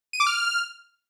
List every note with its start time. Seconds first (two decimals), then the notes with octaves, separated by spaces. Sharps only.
0.13 D#7
0.20 D6
0.27 F6